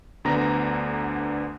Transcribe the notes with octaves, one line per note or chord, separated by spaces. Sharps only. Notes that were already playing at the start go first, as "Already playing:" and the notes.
D2 D3 B3 A#5 A#6